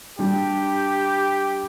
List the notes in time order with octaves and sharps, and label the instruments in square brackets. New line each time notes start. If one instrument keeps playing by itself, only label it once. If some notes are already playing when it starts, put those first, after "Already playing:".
[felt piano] G3 D4 [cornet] G4